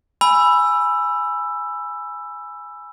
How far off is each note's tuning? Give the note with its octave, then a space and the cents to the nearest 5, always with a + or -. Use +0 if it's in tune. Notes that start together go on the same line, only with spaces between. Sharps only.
G#5 +0 B5 +0 E6 +10